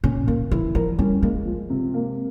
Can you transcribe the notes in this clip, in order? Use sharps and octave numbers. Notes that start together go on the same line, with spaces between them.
A#2 C#4
A#2 A#3
E3 E4
F3 A#4
G3 C#4
G#3 A#3
F3
C3
A#3